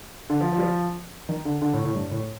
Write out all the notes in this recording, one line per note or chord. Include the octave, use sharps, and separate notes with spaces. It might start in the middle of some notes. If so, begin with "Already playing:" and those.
D3
F3
F3
G3
F3
D#3
D3
D3
A2
A2
G2
A2